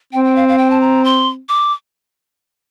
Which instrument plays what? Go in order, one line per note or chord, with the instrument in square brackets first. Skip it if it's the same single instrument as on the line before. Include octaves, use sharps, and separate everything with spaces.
[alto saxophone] C4 [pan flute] G5
[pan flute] G5
F5
F5
G5
A5
A#5
C6
D6